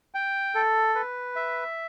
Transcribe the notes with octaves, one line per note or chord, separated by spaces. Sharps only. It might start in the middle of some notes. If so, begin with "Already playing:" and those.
G5
A4
B4
E5